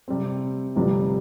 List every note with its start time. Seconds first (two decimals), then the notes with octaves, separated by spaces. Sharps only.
0.08 C3 G3 C4
0.76 G1 F2 C3 G3